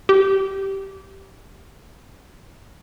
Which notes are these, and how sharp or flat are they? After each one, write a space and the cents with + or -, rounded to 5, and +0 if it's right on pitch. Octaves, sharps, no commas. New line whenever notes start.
G4 -10